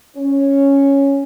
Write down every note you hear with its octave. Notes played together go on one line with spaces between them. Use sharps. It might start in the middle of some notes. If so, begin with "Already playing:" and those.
C#4